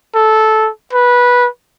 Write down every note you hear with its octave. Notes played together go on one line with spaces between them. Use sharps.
A4
B4